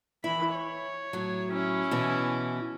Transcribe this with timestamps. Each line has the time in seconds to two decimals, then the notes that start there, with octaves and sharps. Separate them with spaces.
0.24 E3 E4 B5
0.55 C#5
1.13 A2 F#3
1.52 C#4 E4
1.91 B2 E3